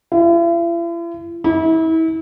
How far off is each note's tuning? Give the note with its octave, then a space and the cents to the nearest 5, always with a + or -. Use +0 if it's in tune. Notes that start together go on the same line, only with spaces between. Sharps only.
E4 +45
E4 -35